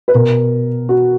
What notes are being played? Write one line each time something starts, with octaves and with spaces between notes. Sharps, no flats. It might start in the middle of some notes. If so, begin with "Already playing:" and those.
B4
B2 A#4
F#4